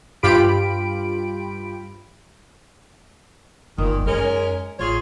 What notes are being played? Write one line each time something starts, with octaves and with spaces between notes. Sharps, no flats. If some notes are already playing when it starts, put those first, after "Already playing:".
G2 F4 G4 B5 D7
G1 A#2 D#3
F#2 G#3 C#4 D#4 A#4
A1 F4 G#4 C#5